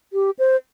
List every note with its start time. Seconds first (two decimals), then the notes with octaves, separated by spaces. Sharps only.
0.13 G4
0.39 C5